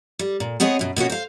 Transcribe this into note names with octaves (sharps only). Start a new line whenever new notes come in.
G3
A#2
B3 C4 G#4 C#5 D#5
F#2 B2
B2 A#3 C#4 F#4
C5 F5